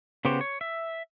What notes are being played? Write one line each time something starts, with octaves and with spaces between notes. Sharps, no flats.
C#3 B3 F#4 G4 C5
C#5
E5